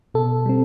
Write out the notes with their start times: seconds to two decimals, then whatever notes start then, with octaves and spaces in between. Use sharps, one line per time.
0.14 B2 A4
0.46 G3 C4